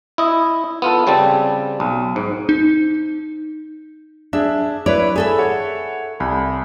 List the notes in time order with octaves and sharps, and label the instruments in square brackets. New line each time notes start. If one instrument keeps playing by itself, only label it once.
[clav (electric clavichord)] E4 D#5
B3 F4 A4
C#3 G3 C4 A5
B1
G#2
[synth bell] D#4
[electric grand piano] D4 G#4 [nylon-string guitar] E5
[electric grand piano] E4 B4 [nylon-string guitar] C#5 D5
[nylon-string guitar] G#4 A4 E5 [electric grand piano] B5
[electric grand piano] C#5 F#5
C2 G#5 B5